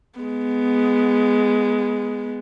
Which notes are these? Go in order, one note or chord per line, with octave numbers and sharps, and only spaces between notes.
G#3 B3